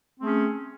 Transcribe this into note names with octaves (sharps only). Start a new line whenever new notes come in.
A3 C4 C#4 G#4